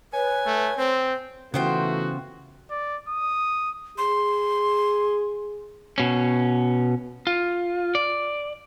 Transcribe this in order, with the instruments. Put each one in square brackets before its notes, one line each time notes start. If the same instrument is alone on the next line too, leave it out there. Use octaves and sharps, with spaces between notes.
[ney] B4 [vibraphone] C#5 [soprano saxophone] G#5
[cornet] A3
[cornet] C4 [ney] C5
[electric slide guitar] C#3 F4 [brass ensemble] E3 A3 F#4 [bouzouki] B3 C5 G5
[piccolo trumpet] D5
D#6
[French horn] G#4 [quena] C6
[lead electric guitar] B2 C#4
F4
D5